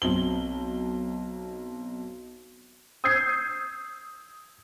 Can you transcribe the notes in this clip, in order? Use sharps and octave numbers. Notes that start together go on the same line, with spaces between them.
B1 C4 G7
D#6 E6 G6 G#6 C7